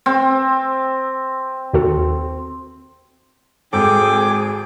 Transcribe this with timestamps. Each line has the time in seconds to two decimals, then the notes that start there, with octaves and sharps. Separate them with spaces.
0.06 C4
1.73 D#2 F#4 A4
3.73 G#1 G#4 A4 G5 D6 E6